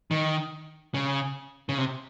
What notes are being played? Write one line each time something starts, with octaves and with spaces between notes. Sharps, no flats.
D#3
C#3
C#3
C3